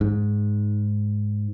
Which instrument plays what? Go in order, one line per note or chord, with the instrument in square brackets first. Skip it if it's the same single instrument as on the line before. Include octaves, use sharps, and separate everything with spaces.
[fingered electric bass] G#2